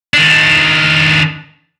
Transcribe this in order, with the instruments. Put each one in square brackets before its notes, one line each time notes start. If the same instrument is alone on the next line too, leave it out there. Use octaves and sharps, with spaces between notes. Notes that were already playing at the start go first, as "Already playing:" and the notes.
[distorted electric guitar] D#3 D4